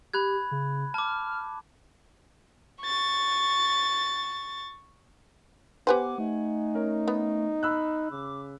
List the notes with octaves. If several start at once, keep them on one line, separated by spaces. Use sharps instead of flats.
G4 B5 F#6 G#6
C#3
A5 D6 F6
C#6 A6
B3 G4 B4 C5 F#5 G#5 D6
A3 D#4
C#4 A#4
B3
B5 E6 F#6
C#3 D6